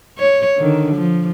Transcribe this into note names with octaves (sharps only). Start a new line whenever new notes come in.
C#5
D3 D#3
F3